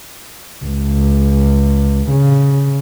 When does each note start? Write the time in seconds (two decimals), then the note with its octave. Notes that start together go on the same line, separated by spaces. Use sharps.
0.65 C#2
2.10 C#3